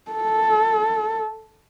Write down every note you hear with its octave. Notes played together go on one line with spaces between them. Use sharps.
A4